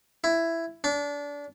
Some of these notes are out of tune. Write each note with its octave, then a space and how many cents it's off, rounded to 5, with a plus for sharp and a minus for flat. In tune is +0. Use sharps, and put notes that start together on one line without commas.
E4 +10
D4 -25